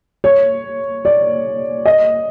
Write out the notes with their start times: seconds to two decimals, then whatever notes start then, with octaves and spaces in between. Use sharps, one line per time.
0.24 C#5
1.05 D5
1.85 D#5